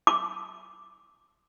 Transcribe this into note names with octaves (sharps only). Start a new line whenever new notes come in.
D6